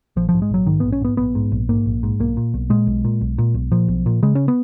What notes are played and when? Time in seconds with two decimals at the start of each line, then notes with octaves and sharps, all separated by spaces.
0.16 A#1 F3
0.29 G#2 F3
0.42 G#3
0.50 A#1 F#3
0.66 G#2 D#3
0.80 A#1 B3
0.92 C#4
1.01 G#2 B3
1.17 A#1 B3
1.35 G#2
1.52 A#1
1.69 G#2 A#3
1.86 A#1
2.03 G#2
2.20 B1 A#3
2.37 A#2
2.54 B1
2.70 A#2 G#3
2.87 B1
3.05 A#2
3.21 B1
3.38 A#2
3.54 B1
3.72 A#2 F3
3.88 B1
4.06 A#2
4.23 C#3 G#3
4.35 C#4
4.48 B3